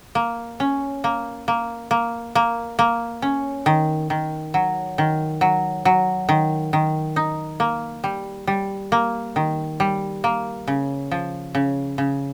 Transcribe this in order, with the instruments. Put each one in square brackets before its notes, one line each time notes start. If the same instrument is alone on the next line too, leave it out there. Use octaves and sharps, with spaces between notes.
[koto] A#3
C#4
A#3
A#3
A#3
A#3
A#3
C#4
D#3
D#3
F#3
D#3
F#3
F#3
D#3
D#3
D#4
A#3
G3
G3
A#3
D#3
G3
A#3
C#3
F3
C#3
C#3